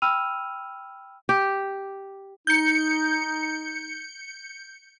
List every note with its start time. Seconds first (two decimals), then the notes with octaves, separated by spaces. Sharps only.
0.02 G5 B5 E6 F6 D#7 F7
1.29 G4
2.47 D#4 G6 C#7